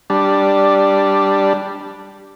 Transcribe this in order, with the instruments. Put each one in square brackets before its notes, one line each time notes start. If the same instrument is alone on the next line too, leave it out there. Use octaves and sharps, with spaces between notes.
[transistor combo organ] G3 D4